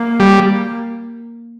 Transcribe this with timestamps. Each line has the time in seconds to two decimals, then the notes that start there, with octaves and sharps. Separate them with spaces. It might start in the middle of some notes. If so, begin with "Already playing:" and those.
Already playing: A#3
0.20 G3